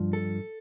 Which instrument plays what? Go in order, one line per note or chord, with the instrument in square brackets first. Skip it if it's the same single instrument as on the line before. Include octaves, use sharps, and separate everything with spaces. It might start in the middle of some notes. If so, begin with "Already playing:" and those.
Already playing: [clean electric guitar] G2 F3
A4